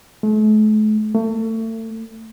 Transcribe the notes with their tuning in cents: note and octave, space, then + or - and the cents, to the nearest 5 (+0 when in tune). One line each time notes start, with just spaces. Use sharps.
A3 -45
A3 +30